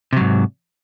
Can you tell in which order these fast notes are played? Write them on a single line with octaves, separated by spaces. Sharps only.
C3 F#3 G#2